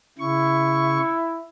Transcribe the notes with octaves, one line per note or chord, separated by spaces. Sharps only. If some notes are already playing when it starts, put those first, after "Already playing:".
C#3 E4 C#6